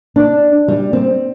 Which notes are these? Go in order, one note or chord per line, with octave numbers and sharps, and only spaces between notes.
D4
G3
C4